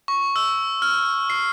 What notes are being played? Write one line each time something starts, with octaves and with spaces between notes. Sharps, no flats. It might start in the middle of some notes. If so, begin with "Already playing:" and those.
C#6
E6
F6
C7